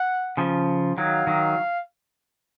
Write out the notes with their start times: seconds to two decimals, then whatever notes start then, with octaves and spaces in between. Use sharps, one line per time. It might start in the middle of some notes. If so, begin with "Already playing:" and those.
Already playing: F#5
0.37 C#3 F3
0.97 D#3 F#3 F5
1.27 D#3 F#3